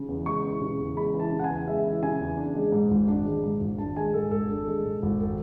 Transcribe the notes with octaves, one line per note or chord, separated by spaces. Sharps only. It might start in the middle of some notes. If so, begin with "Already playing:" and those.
Already playing: C#3
E2
G#3 C#6
E3
C#3
E2
G#3 B5
E3
A5
C#3
F#5
G#5
E2
G#3 E5
E3
C#3 G#5
E2
D4
G#3
G#2
G#1
D4
G#3
G#2
G#1
D4 A5
G#3 G#5
G#2 A4
G#1 A4
D4
G#3
G#2
G#1
A4